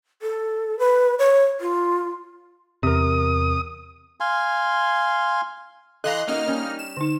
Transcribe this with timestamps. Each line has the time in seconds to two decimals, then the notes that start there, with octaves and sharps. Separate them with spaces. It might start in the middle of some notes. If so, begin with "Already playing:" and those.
0.22 A4
0.79 B4
1.19 C#5
1.61 F4
2.83 E2 C3 A#4 D#6
4.20 F5 G#5 C6
6.04 E3 A4 D#5 F5 A#5 C6 F#6
6.27 A#3 C#4 D#4 F#4 D#5 F6
6.48 G3 C#4
6.79 E7
6.97 D3 D#4